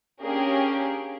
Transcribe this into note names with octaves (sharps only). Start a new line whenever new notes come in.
A#3 C#4 D4 G4 G#4 A#4